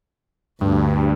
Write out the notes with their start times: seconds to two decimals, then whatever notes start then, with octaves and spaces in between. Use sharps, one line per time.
0.61 D2 G2